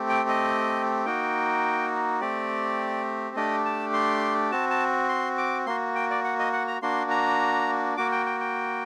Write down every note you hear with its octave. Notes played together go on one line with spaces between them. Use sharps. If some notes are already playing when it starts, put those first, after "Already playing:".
Already playing: A3 C4 G4
G5
D#5
A#3 D#4 F#4 G5
A3 C4 G4 D5
A3 D4 G4 D#5
A5
C6
C4 F#4 A5
A5
C6
D6
A#3 F#4 C6
G5
D5
F#5
D#5
F#5
A#5
A#3 D4 F#4 C6
A#5
A#3 F#4 D6
G5
G5
G5